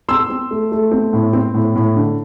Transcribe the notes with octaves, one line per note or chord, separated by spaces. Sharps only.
C4 C6 E6
C4
A3
A3
C4
A2
C4
A2
A2
D3